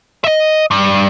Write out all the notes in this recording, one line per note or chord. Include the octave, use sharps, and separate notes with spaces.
D#5 E5
G2